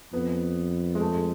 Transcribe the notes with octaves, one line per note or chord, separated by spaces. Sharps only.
F2 B3
G#3
A3
G#3